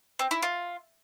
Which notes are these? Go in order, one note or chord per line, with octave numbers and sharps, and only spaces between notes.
C4
E4
F4